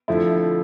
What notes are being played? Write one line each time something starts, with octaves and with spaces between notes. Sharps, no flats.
F2 D3 F3 A3 E4